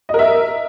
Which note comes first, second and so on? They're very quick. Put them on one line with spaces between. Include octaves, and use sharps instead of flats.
D#5 A#4 E5